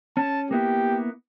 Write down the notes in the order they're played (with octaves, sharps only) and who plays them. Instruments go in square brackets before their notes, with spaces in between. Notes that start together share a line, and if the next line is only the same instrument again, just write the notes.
[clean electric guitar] C#4 [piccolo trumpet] A5
[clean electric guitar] A#3 B3 E4 [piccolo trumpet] G4